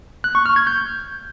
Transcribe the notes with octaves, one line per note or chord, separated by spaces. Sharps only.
F#6
C#6
F6
G#6
G6